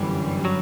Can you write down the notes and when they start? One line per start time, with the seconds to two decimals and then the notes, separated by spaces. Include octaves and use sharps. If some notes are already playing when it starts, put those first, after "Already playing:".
Already playing: G1 F#2 D3 E3 G3
0.45 F#3